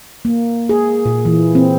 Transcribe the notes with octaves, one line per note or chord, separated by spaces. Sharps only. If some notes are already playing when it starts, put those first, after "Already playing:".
A#3
G#4
A#2
E3
C4